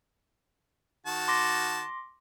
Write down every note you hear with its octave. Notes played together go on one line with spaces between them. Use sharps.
D#3 F#4 A5
C6 D6 A#6